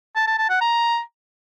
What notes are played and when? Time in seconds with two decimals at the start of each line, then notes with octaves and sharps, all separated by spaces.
0.16 A5
0.27 A5
0.38 A5
0.50 F#5
0.61 A#5